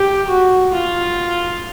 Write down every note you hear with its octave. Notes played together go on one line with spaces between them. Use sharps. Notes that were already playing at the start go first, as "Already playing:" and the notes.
Already playing: G4
F#4
F4